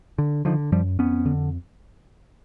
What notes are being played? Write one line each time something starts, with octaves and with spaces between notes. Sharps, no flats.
D3
D3 D#3 F3
F#2 F3 G3
F2 B3 C#4
D3